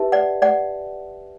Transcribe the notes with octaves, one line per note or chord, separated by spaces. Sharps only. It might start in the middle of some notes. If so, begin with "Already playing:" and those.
Already playing: E4 G4 B4 E5 A5
D5 F#5
D5 F#5